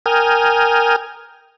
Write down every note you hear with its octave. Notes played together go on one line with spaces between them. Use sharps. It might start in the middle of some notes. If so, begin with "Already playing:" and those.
A#4 G5 G#5 D#6 F6